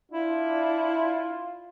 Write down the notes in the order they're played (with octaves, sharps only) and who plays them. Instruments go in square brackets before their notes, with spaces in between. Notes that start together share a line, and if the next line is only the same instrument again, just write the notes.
[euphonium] D4 [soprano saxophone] E4 [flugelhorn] F4